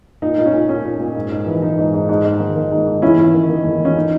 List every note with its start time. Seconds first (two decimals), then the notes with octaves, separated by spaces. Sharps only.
0.22 A#2 D#4
0.38 A#2 D#4
0.46 C#4
0.53 A#2
0.68 A#2 C#4
0.84 A#2
1.00 A#2
1.15 G#2
1.31 G#2
1.47 E3
1.62 E3 D#4
1.78 G#2
1.94 G#2
2.09 G#2
2.25 G#2
2.40 D#3
2.55 D#3
2.72 G#2
2.87 G#2
3.02 E2 C#4 E4
3.18 E2
3.34 D#3
3.49 D#3
3.64 E2
3.80 E2 C#4
3.96 D#4